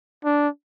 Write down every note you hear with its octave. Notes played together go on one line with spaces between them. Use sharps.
D4